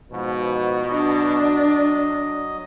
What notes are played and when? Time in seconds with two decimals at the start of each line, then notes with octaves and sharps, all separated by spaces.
0.11 G#2 B2 F3
0.88 F#3 D4 D#5